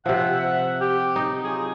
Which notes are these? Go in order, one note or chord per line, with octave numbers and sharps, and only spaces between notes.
C3 F3 E5 F#5
G4
D#4
F#3 F4 G#4